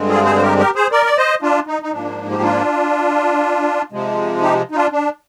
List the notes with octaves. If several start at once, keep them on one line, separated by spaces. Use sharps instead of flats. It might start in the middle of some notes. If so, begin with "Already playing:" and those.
Already playing: G2 D3 G#3 C4
F4 G#4
G#4 C5
C5
G4 A#4
G4 A#4
G#4 C5
A#4 D5
D5
C5 D#5
D4 F4
D#4
D#4
G#2 F3 A#3 D4
G4
D4 F4
C3 F3 G#3
D#4 G4
D#4
D4 F4
D4